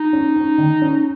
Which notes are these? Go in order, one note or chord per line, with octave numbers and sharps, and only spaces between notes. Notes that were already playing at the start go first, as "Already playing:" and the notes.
Already playing: D#4
C#4
C#4
D#3
C#4